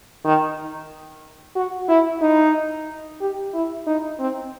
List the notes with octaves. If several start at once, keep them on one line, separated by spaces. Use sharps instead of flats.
D#3
F#4
E4
D#4
G4
E4
D#4
C4